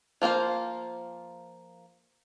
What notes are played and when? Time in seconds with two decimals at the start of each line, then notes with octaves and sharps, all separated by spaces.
0.22 F3 A#3 F4 C5